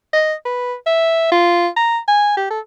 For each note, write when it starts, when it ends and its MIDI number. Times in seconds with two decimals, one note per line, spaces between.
0.13 0.33 75
0.45 0.74 71
0.86 1.31 76
1.32 1.68 65
1.77 1.98 82
2.08 2.32 80
2.37 2.47 67
2.50 2.60 69